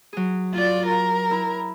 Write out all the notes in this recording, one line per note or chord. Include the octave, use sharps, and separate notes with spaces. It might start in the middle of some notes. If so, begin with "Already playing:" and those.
F#3 G#4
F4 D5
A#4
E4